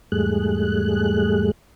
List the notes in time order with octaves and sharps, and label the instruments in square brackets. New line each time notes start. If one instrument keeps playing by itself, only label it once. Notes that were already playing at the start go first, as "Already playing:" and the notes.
[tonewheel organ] E2 G#2 G3 A3 G#4 F#6